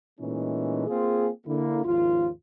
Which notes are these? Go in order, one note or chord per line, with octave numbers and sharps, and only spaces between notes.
A#2 E3 G#3 A3 C#4 D#4
A#3 C4 F4 G#4
D3 A#3 E4
G#1 D#2 F3 F4